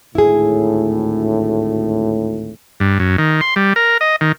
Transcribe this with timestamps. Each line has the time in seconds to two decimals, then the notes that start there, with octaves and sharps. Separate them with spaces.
0.15 G#1 D2 A2 E4 G#4
2.80 G2
3.00 F#2
3.18 D#3
3.41 C6
3.56 G3
3.76 A#4
4.01 D#5
4.21 D#3